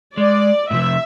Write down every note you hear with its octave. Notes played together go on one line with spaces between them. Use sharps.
G#3 D5
A2 C3 F3 E5